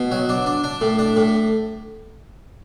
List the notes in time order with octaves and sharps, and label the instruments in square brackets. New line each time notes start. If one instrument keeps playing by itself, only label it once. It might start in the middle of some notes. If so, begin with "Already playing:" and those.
Already playing: [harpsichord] B2
F#3
D4
D4
D4
A2
D4
A2